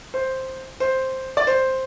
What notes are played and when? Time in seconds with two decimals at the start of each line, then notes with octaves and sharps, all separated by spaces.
0.14 C5
0.80 C5
1.37 D5
1.47 C5